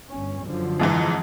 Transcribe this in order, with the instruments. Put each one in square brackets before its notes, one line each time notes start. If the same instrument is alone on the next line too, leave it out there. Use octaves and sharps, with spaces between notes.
[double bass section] G1 C#4
F#2 D3 F3
[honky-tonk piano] F2 G#2 E3